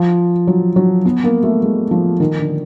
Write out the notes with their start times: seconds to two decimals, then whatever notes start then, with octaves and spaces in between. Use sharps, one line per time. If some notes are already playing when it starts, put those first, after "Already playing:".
Already playing: F3
0.47 F#3
0.76 F#3
1.05 B3
1.24 A#3
1.43 A3
1.63 G#3
1.91 F3
2.20 D#3
2.39 D3